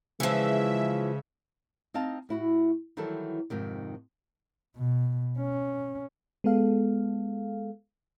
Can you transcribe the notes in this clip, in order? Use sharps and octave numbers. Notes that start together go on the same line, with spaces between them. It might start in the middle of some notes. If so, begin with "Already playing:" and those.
C#3 E3 F3 G#3 E5
C4 D#4 D#5 F5 A5
A2 E4 F#4
D#3 E3 F#3 G3 E4 A4
F2 G#2 C3 D#3
B2
C#4
G#3 B3 A4 F5